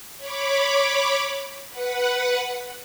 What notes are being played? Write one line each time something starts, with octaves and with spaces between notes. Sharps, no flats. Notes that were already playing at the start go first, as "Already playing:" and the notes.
C#5 B5 D6
B4 F#5